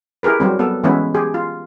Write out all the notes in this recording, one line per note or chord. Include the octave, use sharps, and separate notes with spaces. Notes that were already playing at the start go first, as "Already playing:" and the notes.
E4 G4 G#4 A#4 B4
F#3 G3 C4
B3 A4
E3 G#3 B3 C#4 E4
G4 G#4
F4